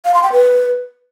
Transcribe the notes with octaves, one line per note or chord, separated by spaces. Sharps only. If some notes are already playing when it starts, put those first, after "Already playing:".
F5
C6
G5
B4